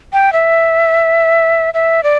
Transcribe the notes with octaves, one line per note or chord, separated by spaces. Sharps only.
G5
E5
E5
D5